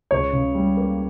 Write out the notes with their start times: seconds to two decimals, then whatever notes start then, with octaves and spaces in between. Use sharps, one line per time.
0.11 C#2 C#5
0.33 C#3
0.55 G3
0.77 A#3